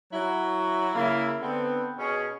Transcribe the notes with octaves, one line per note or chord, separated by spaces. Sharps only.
F#3 E4 F#4
C#3 A#3 E4
D3 B3 C4
B2 C#4 G#4